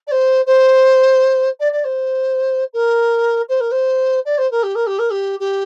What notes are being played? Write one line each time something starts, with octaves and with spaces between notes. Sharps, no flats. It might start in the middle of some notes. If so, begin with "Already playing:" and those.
D5
C5
C5
D5
D5
C5
A#4
C5
A#4
C5
D5
C5
A#4
G4
A#4
G4
A#4
G4
G4